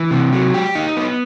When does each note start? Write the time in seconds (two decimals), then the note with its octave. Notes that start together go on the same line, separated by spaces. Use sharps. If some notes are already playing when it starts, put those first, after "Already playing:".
Already playing: E3
0.11 C3
0.33 F#3
0.54 G4
0.75 D#4
0.97 B3